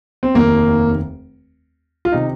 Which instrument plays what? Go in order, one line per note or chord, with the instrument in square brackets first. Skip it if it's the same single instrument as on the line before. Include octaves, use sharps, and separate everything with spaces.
[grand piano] C4
F1 D#2 D#3 A#3
F4
C3 D#3 D#4